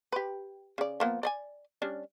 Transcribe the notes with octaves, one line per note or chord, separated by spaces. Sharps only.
G4 B4
C#3 D5
F3 A#3 B3
D5 D#5 G#5
G3 C#4 D4